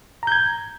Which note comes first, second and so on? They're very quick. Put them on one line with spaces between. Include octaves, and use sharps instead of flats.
A#5 G6 G#6